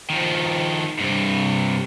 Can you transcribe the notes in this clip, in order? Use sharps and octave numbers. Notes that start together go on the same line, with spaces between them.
D#3 F3
G2 C3